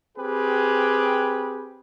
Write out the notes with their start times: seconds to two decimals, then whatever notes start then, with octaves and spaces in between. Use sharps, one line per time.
0.17 C4 G4 G#4 B4